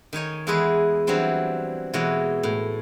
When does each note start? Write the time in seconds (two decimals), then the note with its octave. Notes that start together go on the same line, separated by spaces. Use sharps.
0.13 D#3 D#4 C#5 G#5
0.47 E2 E3 G#3 G#4 B4 C6
1.07 E3 F#3 G3 C4 D4
1.93 B2 E3 G#3 C#5 F#5
2.43 A2